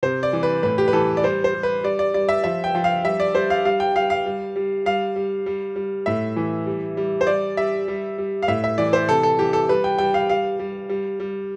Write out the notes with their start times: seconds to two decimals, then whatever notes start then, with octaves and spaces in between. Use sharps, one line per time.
0.03 C3 C5
0.23 D5
0.33 E3
0.43 B4
0.63 A2 B4
0.78 G4
0.88 B4
0.93 E3 A4
1.17 D5
1.23 G3 C5
1.44 C5
1.54 G3
1.63 B4
1.84 G3 D5
1.99 D5
2.14 G3 D5
2.29 E5
2.44 F3 E5
2.64 G5
2.75 F3
2.84 F5
3.04 G3 E5
3.20 D5
3.35 G3 C5
3.50 F5
3.65 G3 F5
3.80 G5
3.96 G3 F5
4.10 F5
4.26 G3
4.56 G3
4.86 G3 F5
5.16 G3
5.46 G3
5.76 G3
6.06 A2 E5
6.36 E3
6.66 G3
6.97 G3
7.21 C5
7.27 G3 D5
7.57 G3 E5
7.88 G3
8.18 G3
8.42 F5
8.48 A2 E5
8.64 E5
8.78 E3 D5
8.93 C5
9.08 C3 A4
9.23 A4
9.39 E3 G4
9.53 A4
9.69 G3 B4
9.84 G5
9.98 G3 G5
10.14 F5
10.29 G3 F5
10.59 G3
10.89 G3
11.20 G3